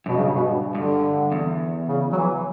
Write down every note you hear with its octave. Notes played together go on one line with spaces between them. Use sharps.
F#2 B2
G2 C#3
B2
G2 D3
E2
C#3
F#3
E3